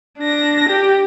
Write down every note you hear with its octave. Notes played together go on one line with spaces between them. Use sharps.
D4 A#6
G4